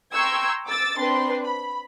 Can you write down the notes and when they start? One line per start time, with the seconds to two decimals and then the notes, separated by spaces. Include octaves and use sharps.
0.12 G5 A#5 C6 C#6 E6 G#6
0.66 D6 E6 A6
0.98 C4 D4 B4 C6
1.44 B5